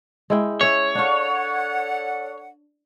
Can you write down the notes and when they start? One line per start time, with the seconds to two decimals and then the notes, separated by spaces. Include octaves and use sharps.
0.30 G#3 E4 G5
0.61 C#4 C#5 E5
0.95 D4 A4 D5 F5 F#5